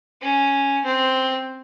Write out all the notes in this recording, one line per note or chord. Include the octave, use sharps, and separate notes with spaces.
C#4
C4